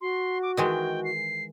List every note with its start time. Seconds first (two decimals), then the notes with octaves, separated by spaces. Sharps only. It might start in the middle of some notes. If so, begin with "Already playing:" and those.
0.01 F#4 C6
0.42 D6
0.57 D#3 E3 G#3 G5
1.04 C7